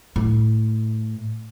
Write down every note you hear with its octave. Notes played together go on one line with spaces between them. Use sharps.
A2